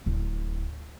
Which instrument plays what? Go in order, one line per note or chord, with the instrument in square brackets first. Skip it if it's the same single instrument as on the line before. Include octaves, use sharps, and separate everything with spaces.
[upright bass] D1